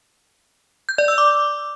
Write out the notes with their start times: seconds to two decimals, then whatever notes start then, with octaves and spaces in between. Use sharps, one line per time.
0.89 G6
0.98 D5
1.08 E6
1.18 D6